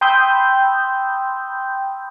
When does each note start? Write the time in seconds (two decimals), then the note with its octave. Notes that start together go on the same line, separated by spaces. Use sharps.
0.01 G5 B5 C6 D#6 E6 G6